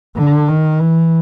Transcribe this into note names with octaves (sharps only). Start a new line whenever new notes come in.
D3
D#3
E3